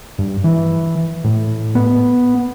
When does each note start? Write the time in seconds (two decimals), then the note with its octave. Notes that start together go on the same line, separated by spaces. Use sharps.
0.19 G2
0.44 E3
1.24 A2
1.75 B3